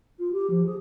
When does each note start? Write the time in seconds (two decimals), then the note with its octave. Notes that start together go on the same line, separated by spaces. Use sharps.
0.19 F4
0.32 G4
0.50 F3
0.65 G#4